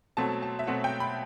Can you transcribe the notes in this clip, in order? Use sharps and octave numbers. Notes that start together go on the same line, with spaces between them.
B2 F#3 A3 C4 A5
A5
E5
B2 F#3 A3 C4 F#5
G5
B5